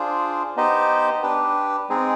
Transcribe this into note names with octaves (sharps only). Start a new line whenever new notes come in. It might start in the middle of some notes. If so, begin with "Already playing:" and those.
Already playing: D4 F4 G#4 C5
B3 D#4 G4 C5 D#5
D4 G4 B4
G#3 C4 D#4 G#4